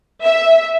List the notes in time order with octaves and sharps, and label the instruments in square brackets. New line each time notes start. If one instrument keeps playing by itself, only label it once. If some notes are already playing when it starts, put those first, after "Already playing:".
[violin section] E5